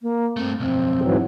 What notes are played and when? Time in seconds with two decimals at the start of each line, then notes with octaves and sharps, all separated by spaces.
0.02 A#3
0.37 G2 A3 C4
0.60 B1 F2 C4
1.02 G#2 E3 F#3